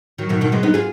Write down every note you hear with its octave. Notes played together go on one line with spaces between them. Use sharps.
D#3 F#3
B2 D#3
B2 D#3
G#3 B3
B3 D#4
F4 G#4